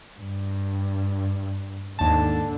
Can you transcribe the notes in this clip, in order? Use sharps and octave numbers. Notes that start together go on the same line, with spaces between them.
G2
D#2 G#2 D3 A5